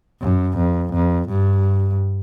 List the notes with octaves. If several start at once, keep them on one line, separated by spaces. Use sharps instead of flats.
F#2
F2
F2
G2